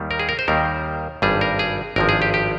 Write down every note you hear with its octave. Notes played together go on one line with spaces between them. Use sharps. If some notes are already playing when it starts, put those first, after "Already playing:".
Already playing: D#2 D#3 G3
A#4
G#4
A#4
C5
D#2 D#3 G3 A#4
G#1 G2 G3 G#4
A#4
G#4
G#1 G2 F3 A#4
G#4
G4
G4